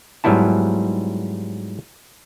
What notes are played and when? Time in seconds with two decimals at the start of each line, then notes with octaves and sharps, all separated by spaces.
0.24 G#2 F#3 G3 B3 E4 A5